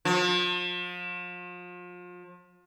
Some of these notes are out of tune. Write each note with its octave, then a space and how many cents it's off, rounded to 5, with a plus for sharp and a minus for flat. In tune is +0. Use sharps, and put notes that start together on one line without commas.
F3 +35